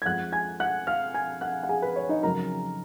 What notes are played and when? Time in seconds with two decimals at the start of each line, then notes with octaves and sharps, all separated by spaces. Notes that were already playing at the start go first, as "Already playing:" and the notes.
0.02 G#6
0.05 F2 F3 G#3 F#5 F#6
0.33 G#5 G#6
0.60 F#5 F#6
0.87 F5 F6
1.14 G#5 G#6
1.41 F#5 F#6
1.63 F#5
1.69 G#4 G#5
1.82 B4
1.96 C#5
2.09 D#4 D#5
2.23 F2 C#3 F#3 A#4 A#5